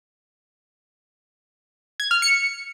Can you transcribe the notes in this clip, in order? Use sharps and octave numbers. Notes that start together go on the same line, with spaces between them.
G#6
F6
C#7